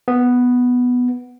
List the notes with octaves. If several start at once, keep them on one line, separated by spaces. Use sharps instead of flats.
B3